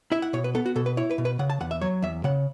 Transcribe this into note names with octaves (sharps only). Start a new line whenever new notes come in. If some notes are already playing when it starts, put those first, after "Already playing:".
E4 E5
F#5
B2 C#5
B4
B3 A4
F#4
B2 A4
B4
E4 C#5
B4
B2
B4
C#3 F#5
A5
E2 F#5
E5
F#3 C#5
E2 E5
C#3 F#5